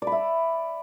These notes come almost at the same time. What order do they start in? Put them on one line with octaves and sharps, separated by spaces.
D5 B5 E5